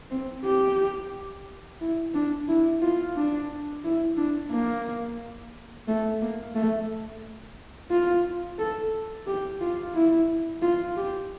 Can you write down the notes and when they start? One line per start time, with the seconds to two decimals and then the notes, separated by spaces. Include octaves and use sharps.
0.11 C4
0.45 G4
1.81 E4
2.14 D4
2.48 E4
2.82 F4
3.16 D4
3.84 E4
4.17 D4
4.51 A#3
5.88 A3
6.21 A#3
6.55 A3
7.91 F4
8.59 A4
9.27 G4
9.61 F4
9.95 E4
10.62 F4
10.97 G4